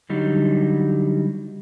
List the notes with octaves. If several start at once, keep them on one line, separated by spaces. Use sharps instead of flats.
D3 F#3 G3 D#4